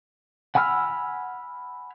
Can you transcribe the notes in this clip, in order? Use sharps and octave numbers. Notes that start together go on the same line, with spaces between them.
F#5 G#5 B5 E6 F6